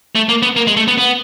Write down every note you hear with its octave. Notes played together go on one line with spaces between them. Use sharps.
A3
A#3
B3
A#3
G#3
A3
B3
B3